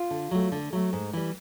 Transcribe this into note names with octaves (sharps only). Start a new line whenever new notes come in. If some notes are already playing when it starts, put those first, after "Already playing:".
Already playing: F4
D3
F#3 A3
D3
F#3 A3
G#2
E3 G3